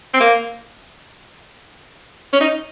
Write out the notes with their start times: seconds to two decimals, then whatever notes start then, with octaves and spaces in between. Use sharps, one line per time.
0.14 C4
0.21 A#3
2.33 C#4
2.41 D#4